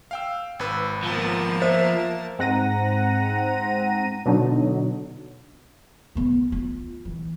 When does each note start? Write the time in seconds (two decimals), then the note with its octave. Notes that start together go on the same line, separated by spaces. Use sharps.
0.11 F5 G5 E6
0.59 G#1 B4 E6
1.03 F3 A#3 B3 A5
1.62 C5 E5
2.39 G#2 C4 F#5 A#5 A#6 D#7
4.26 B2 D3 F#3 D4 D#4
6.15 C#3 B3
6.52 F4
7.05 E3